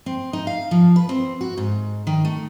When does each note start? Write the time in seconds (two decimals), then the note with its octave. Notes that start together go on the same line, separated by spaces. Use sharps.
0.06 C4
0.33 D#4
0.47 F5
0.71 F3
0.96 B4
1.09 C4
1.41 F#4
1.57 G#2
2.07 D#3
2.25 A3